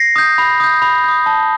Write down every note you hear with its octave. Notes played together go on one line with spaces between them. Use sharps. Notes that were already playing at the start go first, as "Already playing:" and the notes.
Already playing: A#6 C7
D#6 G6
B5
D#6 G6
B5
D#6 G6
A5